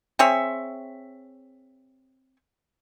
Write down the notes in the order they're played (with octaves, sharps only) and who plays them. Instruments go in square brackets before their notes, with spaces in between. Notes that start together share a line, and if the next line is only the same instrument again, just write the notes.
[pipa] C4 G#4 C#5 E5